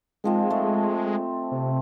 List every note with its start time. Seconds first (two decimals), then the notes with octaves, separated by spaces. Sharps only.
0.24 D#3 F3 G#3 C4
0.50 A3
1.51 C3